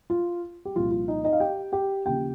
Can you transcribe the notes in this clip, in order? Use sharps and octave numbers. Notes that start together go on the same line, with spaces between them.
F4
G4
C2 A#2 F3 F4
F4
D#4 D#5
D#4 D#5
F5
G4 G5
G4 G5
D#2 C#3 F3 G4 G5